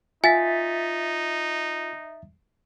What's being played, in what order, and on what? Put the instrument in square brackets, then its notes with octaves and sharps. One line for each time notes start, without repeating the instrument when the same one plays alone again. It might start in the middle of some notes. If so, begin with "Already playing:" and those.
[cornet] D#4 [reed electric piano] F4 [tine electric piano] E5 A6 B6 [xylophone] G#5